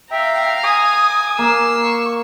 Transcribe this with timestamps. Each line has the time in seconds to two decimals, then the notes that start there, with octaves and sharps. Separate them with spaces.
0.11 E5 F5 G5 A#5
0.63 G#5 D#6
1.39 A#3 E6 C7
1.82 C#6